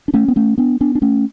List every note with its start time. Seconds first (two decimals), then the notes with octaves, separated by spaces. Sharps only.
0.08 D4
0.14 A3 C#4
0.28 B3
0.36 A3 C#4
0.58 B3 D4
0.81 B3 D4
0.95 D4
1.02 A3 C#4